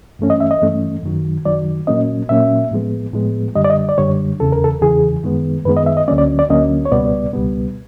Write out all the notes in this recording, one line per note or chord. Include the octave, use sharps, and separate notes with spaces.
G2 E3 A3 C#4
D#5
E5
D#5
G2 E3 A3 C#4
F#2 D#3 F#3
F#2 D#3 F#3 D5
A#2 F#3 A#3 C#4 D#5
A#2 F#3 A#3 C#4 E5
A2 F3 G#3 B3
A2 F3 G#3 B3
F#2 D3 G3 D#5
D5
D#5
D5
F#2 D3 G3 C#5
E2 C#3 E3 A4
A#4
A4
E2 C#3 E3 G#4
F#2 D#3 G#3 B3
F#2 D#3 G#3 B3 B4
D#5
E5
D#5
D2 D3 F#3 A#3 C#4 D5
D5
D5
D2 D3 F#3 A#3 C#4 D#5
C#5
C#2 B2 G3 B3 D5
C#2 B2 G3 B3